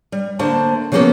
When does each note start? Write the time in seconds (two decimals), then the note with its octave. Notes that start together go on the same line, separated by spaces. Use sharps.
0.12 G3
0.39 D3 A3 A#3 C5 A5
0.92 C#3 F3 F#3 A#3 B3 C#4